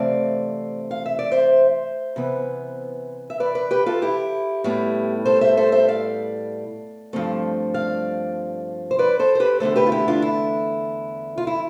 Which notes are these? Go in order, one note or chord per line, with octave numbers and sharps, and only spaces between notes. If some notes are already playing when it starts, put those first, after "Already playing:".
Already playing: C3 E3 A3 C4 D5 F5
F5
E5
D5
C5 E5
C3 E3 B3
E5
B4 D5
B4 D5
G4 B4
F4 A4
E4 G4
A2 G3 B3
A4 C5
C5 E5
A4 C5
C5 E5
D5 F5
G2 F3 A3 C4
D5 F5
C5
B4 D5
A4 C5
C5
G4 B4
E2 D3 A3 A4 C5
G4 B4
F4
E4 G4
D4 F4
E4
F4
E4